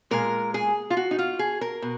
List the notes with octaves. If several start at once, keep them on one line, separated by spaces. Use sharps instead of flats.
A#2 G#3 A#4
G#4
F4
F#4
D#4
F4
G#4
A#4
B2